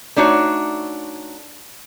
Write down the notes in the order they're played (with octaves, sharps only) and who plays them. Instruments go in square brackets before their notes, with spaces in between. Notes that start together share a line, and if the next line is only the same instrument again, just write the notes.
[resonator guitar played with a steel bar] A3 D4 D#4 F#4 C#5